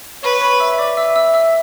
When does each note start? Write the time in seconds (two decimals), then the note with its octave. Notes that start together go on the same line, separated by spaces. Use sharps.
0.23 B4 C#5 C#6
0.41 C#5 C#6
0.60 E5 E6
0.78 D5 D6
0.97 E5 E6
1.15 E5 E6
1.34 E5 E6